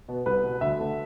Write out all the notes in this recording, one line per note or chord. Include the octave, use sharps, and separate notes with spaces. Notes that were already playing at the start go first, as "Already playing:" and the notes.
B2 B3
C2 B4
B2 B3
D2 E5
D3 A3